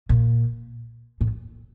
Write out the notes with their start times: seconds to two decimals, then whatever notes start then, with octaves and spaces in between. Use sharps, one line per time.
0.09 A#2
1.21 A2